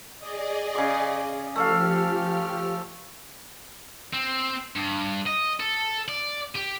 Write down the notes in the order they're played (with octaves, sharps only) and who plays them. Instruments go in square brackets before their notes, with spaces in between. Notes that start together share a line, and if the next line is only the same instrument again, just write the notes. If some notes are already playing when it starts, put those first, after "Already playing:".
[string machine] G#4 D5 D#5
[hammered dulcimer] C#3 D6
[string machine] F3 G4 F6 [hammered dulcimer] A3 A4 F5
[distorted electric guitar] C4
G2
D#5
A4
D5
G4